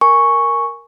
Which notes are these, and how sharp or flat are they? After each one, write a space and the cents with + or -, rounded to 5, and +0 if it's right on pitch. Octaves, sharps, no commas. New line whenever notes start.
A#4 +0 G#5 +0 C#6 +0